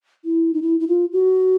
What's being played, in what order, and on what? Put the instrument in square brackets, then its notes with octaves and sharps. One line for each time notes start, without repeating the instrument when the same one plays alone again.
[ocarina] E4
D#4
E4
E4
F4
F#4